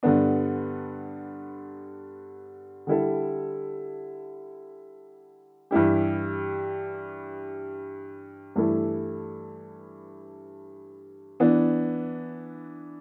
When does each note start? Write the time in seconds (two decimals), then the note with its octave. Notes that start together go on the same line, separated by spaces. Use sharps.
0.03 G2 D3 B3 D4
2.87 D3 G3 E4 A4
5.71 G2 E3 G3 E4 G4
8.56 G2 E3 A3 E4 A4
11.40 E3 B3 D4